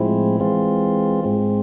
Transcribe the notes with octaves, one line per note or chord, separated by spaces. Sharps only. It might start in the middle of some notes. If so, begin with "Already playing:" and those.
Already playing: A2 F3 G#3 C4 E4
E3 G#3 C4 F4
G#2 G#3 C4